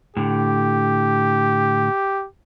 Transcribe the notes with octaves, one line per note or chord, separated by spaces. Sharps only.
A2 D3 G4